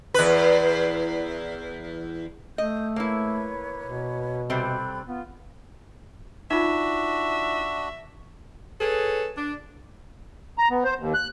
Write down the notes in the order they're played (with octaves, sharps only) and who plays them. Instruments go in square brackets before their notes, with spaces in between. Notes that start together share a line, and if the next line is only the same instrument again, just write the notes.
[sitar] E2 B4
[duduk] A3 [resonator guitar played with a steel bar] D#5 [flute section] G6
[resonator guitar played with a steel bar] A#3 E4 [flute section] B4 C#5
[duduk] B2
[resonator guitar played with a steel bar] C3 G3 C4 [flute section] A4 B5 F#6
[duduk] B3 [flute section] F4
[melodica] D4 F#4 [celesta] D#4 F4 [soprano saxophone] E5
[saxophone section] G#4 A4 B4 C#5
D4
[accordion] A#5
B3
C5
D#2
F#6